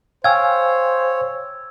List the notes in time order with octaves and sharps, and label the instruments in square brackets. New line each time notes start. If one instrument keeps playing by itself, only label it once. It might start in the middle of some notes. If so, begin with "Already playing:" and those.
[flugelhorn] C5 [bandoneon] C#5 [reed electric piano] F5 G5 G#5 [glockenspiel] E6 G#6